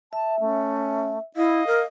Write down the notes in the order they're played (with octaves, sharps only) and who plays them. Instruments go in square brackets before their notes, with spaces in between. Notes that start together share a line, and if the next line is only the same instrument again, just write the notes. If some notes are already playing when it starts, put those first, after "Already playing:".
[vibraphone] E5 [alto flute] A5
[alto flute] A3 [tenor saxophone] C#4
[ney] E4 [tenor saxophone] D#5 [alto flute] F5
[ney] A#4